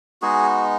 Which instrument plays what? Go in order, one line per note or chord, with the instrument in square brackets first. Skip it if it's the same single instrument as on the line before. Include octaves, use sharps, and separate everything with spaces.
[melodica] G#3 B3 D#4 F#4 G#4